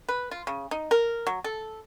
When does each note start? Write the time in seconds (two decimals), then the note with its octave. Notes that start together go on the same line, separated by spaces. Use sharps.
0.08 B4
0.31 F4
0.47 C#3
0.71 D#4
0.91 A#4
1.27 F#3
1.44 A4